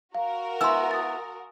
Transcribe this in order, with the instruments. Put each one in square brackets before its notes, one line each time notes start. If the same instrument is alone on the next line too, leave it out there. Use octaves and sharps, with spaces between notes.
[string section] F#4 A#4 [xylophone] F5
[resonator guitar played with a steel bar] B3 E4 [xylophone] G#5 [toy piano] C6 E6
[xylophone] D#6 A6